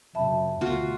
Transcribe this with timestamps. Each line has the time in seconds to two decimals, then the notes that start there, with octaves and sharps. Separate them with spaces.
0.15 F#2 A#2 C#3 E5 A5 B5
0.61 D2 B2 F4 F#4